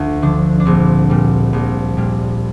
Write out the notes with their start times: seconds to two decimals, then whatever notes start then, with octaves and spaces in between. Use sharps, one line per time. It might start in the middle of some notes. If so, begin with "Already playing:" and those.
Already playing: D2 F4
0.22 D3 F3 D4
0.60 D4
0.65 A#1 C4
1.10 A#2 G3
1.53 A#1
1.97 A#2 G3